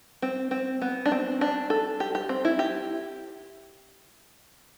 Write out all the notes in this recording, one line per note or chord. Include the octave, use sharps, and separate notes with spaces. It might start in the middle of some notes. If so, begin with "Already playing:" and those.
C4
C4
B3
D4
C4
D4
A4
G4
G4
C4
E4
G4